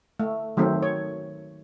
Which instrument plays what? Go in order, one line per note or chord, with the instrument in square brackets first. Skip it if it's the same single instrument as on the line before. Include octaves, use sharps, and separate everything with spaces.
[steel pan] A3
D#3 F#3 A3 C4 A4
C#5